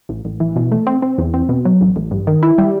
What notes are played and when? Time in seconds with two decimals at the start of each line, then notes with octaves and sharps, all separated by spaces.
0.09 A1
0.25 A1
0.40 E3
0.56 B2
0.72 A3
0.87 C4
1.02 C4
1.18 E2
1.34 C4
1.49 B2
1.65 F#3
1.81 A1
1.96 A1
2.11 G2
2.27 D#3
2.43 E4
2.58 G3